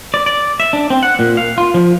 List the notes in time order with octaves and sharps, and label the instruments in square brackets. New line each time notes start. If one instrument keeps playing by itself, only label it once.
[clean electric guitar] D5
D5
E5
D4
C4
F#5
A#2
F5
F4
F3